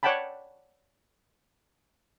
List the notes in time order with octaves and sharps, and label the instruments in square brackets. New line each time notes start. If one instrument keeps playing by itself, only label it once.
[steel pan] C#5 D5 F#5 G5 A5 B5